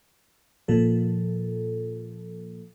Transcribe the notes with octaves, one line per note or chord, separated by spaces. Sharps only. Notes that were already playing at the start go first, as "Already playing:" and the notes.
A#2 F3 A4